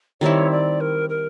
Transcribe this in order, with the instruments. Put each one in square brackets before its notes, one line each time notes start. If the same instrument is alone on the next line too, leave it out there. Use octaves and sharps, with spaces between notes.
[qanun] D#3 G3 C4 E4 [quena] C#5
[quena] D5
A#4
A#4